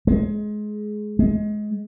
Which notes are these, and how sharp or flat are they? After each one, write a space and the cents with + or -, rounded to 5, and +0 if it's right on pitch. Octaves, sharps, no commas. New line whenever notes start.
G#3 +20
G#3 +20